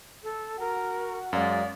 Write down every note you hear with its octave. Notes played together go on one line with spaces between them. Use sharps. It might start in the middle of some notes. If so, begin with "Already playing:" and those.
A4
F#4 A#4 F#5
F#2 G#3 D5 F5